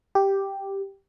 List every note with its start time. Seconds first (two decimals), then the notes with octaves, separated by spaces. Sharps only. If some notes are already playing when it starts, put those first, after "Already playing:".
0.15 G4